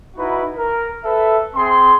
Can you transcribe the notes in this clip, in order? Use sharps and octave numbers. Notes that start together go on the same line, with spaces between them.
D#4 E4 F#4 B4 F#5
A#4
A4 B4 E5
C4 G#4 C6